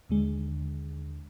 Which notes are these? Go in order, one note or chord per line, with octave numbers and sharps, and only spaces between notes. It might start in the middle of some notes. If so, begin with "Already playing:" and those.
D#2 D3 G#3